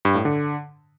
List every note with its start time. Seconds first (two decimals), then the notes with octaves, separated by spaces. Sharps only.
0.05 G2
0.15 A2
0.25 D3